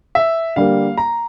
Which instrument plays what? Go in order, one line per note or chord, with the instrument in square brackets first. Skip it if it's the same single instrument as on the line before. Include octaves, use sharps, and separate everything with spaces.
[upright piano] E5
[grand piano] D3 G3 A#3 [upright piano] F5
[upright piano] A#5